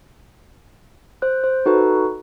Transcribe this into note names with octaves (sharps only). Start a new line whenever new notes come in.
C5 F#6
C5
D#4 F#4 A4 B4